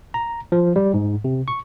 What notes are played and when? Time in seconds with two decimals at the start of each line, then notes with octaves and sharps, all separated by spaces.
0.14 A#5
0.52 F3
0.76 G3
0.94 G#2
1.24 C3
1.48 C#6